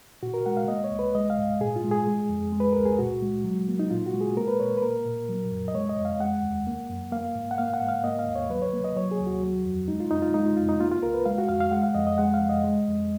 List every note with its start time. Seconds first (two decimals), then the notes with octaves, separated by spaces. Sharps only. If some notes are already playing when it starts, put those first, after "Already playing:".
0.23 A#2 F#4
0.34 A#4
0.46 G#3 F#5
0.57 F5
0.68 A#3 D#5
0.84 C#5
0.92 C#2
0.99 B4
1.14 G#3 D#5
1.30 F5
1.38 G#2
1.60 A#2 G#4
1.76 F4
1.84 G#3
1.91 G#4
2.07 G#3
2.29 F2
2.52 G#3
2.60 B4
2.73 C#2 A#4
2.85 G#4
2.99 A#2 F#4
3.22 G#3
3.44 F#3
3.68 A#3
3.79 D#4
3.90 A#2 F4
4.06 F#4
4.14 G#3
4.21 G#4
4.37 A#3 A#4
4.48 B4
4.60 A#2 C#5
4.77 B4
4.82 A#3 A#4
5.05 A#2
5.29 F#3
5.51 F#2
5.68 D#5
5.74 G#3 C#5
5.89 D#5
5.97 F2
6.05 F5
6.20 G#3 F#5
6.43 D#2
6.67 A#3
6.89 F#2
7.12 A#3 F5
7.35 G#2
7.51 F#5
7.58 A#3 F5
7.74 F#5
7.81 G#2
7.88 F5
8.04 A#3 D#5
8.19 F5
8.28 D#2
8.35 C#5
8.50 F#3 B4
8.62 C#5
8.73 A#3
8.84 D#5
8.96 F#3 C#5
9.11 G#4
9.20 D#2
9.27 F#4
9.42 F#3
9.65 F2
9.88 G#3 D#4
10.00 F4
10.11 F#2 D#4
10.22 F4
10.34 G#3 D#4
10.45 F4
10.57 F2 F4
10.69 D#4
10.80 A#3 F4
10.92 F4
11.03 C#2 A#4
11.14 B4
11.26 G#3 F5
11.38 F#4
11.49 F2 F5
11.60 F5
11.71 G#3 F#5
11.83 F5
11.94 F2 D#5
12.07 D#5
12.18 G#3 F#5
12.34 F5
12.41 F2
12.49 D#5
12.64 G#3
12.88 F2